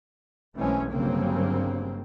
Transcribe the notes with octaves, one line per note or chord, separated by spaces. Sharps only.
B1 E3 G#3 A3 C4 C#4
G1 G2 C#3 F#3 A#3 C4